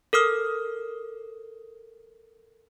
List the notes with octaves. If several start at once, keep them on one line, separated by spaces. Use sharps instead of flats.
A4 A#4 D#6 F6